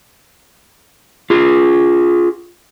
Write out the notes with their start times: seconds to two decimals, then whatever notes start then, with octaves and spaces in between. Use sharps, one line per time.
1.30 F4 G#4